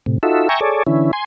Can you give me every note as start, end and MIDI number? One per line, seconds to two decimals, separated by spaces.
0.06 0.18 45
0.06 0.18 48
0.23 0.49 63
0.23 0.49 65
0.23 0.49 66
0.23 0.49 69
0.23 0.49 76
0.49 0.60 76
0.49 0.60 79
0.49 0.60 80
0.49 0.60 82
0.49 0.60 85
0.61 0.83 68
0.61 0.83 69
0.61 0.83 73
0.61 0.83 74
0.87 1.11 50
0.87 1.11 52
0.87 1.11 61
0.87 1.11 64
1.13 1.24 80
1.13 1.24 84